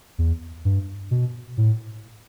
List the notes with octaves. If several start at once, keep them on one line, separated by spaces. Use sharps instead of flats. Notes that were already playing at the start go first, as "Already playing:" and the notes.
E2
G2
B2
A2